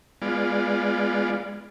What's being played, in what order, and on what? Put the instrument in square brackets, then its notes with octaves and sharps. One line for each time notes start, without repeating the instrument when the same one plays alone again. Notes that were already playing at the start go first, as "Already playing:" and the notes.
[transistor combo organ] G#3 B3 F4 D5